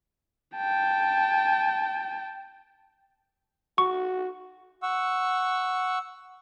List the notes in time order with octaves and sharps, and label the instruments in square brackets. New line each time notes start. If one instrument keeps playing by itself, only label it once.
[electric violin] G5 A5
[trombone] F#4 [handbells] C#6
[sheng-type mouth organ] F#5 C#6 E6